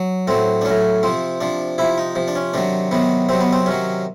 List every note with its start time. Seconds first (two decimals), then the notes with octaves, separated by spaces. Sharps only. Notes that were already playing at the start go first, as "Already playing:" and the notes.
Already playing: F#3
0.27 A2 F#3 C4
0.61 D4
0.65 A2 F#3 C#4
1.03 C3 F3 C4
1.41 C3 F3 D4
1.78 C3 F3 E4
1.98 D#4
2.15 C3 F3
2.28 D4
2.35 C#4
2.54 C3 D#3 F#3 D4
2.91 C3 D#3 F#3 B3
3.29 C3 D#3 F#3 C4
3.40 B3
3.53 C4
3.66 C3 D#3 F#3 C#4